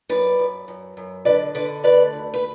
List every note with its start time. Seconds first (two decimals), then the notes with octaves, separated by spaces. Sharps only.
0.09 F#2 B4 D5
0.39 F#2
0.68 F#2
0.97 F#2
1.25 D3 B4 D5
1.55 D3 B4 D5
1.84 A3 B4 D5
2.13 D2
2.34 B4